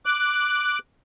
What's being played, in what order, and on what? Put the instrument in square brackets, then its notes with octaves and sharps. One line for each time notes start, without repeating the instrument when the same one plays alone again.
[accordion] D6 F#6